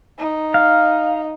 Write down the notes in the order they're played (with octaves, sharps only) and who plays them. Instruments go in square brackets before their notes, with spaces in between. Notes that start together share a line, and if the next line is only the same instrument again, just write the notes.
[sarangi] D#4
[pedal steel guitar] F5